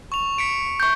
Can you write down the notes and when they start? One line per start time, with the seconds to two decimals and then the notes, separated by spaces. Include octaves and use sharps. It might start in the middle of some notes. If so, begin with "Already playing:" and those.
0.12 C#6 F7
0.38 B6 C#7 D7
0.80 C#6 G6